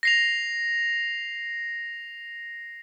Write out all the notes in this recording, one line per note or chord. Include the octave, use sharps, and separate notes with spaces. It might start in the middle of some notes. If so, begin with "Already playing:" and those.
A#6 C7 F7